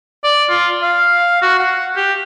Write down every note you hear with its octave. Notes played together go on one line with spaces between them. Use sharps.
D5
F4
F5
F#4
F#5
G4